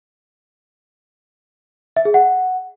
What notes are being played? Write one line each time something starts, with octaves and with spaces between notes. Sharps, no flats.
E5
G#4
F#5